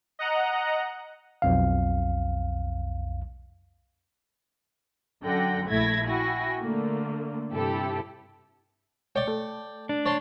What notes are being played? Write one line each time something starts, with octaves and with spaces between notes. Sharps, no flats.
D#5 F#5 A#5
B1 F2 F5
F#2 D3 F#5 G5 A#6
A#1 A3 E4 G#6 A#6 B6
E4 F#4 G5 G#5 A#6
D3 A3 A#3
G2 C3 E4 G4 A4
C#5 D5 G5
A3
D4
C#5 A5 C6